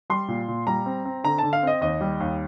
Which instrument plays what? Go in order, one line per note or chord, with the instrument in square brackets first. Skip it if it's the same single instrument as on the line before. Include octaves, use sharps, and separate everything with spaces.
[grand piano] G3 C6
A#2
A#2
G3 A#5
C4
C4
D3 A#5
D3 A5
F5
C4 D#5
D#2 D#5
G3
D#2